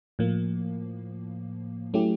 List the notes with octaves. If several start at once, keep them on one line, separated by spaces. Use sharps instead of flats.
A2 F3 A#3
F#3 A3 C#4 E4 G4